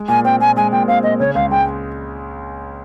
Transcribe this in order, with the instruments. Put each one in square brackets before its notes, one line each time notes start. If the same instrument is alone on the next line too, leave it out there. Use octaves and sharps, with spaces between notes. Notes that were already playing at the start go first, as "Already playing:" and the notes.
Already playing: [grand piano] G#3
[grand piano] A#2 [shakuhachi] G#5
[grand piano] C4 [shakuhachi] G5
[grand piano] A#2 [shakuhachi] G#5
[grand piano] G#3 [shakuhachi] G#5
[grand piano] A#2 [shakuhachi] G5
[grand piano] C4 [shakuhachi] F5
[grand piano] A#2 [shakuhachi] D#5
[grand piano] C#3 [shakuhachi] C#5
[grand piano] C#2 [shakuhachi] F5
[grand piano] G#3 [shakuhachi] G5